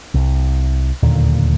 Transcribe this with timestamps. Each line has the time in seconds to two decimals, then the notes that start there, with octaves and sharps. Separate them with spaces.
0.14 C2
1.03 D1 D#2 A#2 D3